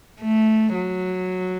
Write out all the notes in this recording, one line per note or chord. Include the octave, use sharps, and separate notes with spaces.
A3
F#3